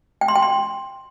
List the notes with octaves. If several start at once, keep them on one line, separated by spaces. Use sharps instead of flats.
G5
C6
G5
C6